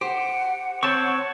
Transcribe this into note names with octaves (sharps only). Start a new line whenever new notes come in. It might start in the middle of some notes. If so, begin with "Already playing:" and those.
G4 C5 F#5
C4 C#5 F#5 A5 C#6